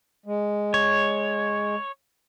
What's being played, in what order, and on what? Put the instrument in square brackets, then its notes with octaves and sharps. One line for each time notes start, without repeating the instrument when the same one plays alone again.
[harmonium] G#3
[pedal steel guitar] C#5